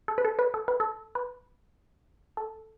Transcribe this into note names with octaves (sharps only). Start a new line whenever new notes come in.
A4
B4
A4
B4
A4
B4
A4
B4
A4